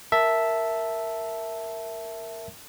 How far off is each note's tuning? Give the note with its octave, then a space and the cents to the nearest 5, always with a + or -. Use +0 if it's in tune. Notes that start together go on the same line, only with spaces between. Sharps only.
A#4 -10 E5 +0 A5 +0